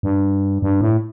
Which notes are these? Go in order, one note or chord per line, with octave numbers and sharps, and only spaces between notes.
G2
G2
A2